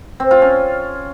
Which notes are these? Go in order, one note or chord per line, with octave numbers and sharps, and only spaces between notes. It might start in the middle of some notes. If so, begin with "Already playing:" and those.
C4
F4
C#4